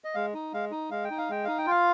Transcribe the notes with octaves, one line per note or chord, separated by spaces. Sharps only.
D#5
G#3 F5
D#4
G#3 F5
D#4
G#3 F5
G5
D#4
F5
G#3 G5
D#4 F5
G5
F4 F5